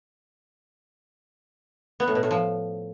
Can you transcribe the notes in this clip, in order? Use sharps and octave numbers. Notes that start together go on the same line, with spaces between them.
B3
A2
B2
A2
F3